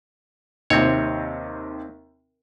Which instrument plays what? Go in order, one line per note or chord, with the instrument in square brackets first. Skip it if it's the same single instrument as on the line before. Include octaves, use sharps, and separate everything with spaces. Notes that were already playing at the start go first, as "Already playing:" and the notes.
[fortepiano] D#2 C3 [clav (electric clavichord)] C4 C#5